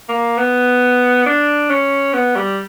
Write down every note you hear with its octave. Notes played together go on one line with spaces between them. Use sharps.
A#3
B3
D4
C#4
B3
G3